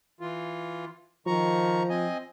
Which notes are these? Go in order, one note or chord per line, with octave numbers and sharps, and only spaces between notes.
E3 F4
D#3 F3 A#5 C#6
C4 D#5 G#5